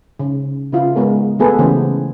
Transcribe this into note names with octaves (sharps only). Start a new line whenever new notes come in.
C#3
C#3 E4 F4
G#3 B3 G#4 A#4
A3 B3 G#4 A4 B4
C#3 E3 A3 B3 G4 C5